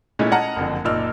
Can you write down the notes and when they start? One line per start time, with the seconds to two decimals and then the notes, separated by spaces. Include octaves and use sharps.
0.19 A#2 G#3 A3 C#4 D#4 E4
0.32 D#5 F#5 A5 A#5 F6 C#7
0.56 F#1 F2 D3
0.84 F#1 A#2 D#4 D5 E6 F6